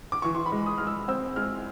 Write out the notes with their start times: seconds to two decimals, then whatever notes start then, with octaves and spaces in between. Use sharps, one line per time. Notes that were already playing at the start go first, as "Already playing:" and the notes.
0.12 D6
0.22 E3 C#6
0.35 C6
0.46 B5
0.52 G#3
0.66 D#6
0.78 G#3 F6
0.87 E6
1.08 C4 E6
1.36 G#3 F6